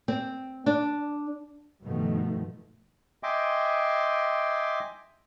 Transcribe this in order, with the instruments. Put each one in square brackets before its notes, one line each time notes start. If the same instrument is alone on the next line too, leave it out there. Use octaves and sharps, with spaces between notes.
[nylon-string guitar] C4
D4
[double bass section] G2 B2 D#3 F3 A3
[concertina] D#5 E5 G5 G#5 C6 D6